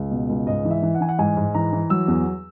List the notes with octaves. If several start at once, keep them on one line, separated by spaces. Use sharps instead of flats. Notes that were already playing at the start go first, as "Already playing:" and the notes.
Already playing: C#2
B2
C#2
G#2 D#5
E3
E5
E3
F#5
E3 G#5
F#5
G#2 G#5
G#2
E3 A#5
E3
F#3 E6
E2